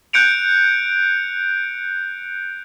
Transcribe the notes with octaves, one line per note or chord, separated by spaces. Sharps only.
F#6 G6 C#7 D7 F7